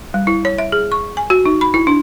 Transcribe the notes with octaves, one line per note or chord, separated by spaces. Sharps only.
G3
E4
C#5
E5
G#4
C#6
G#5
F#4
D#4
B5
E4
D4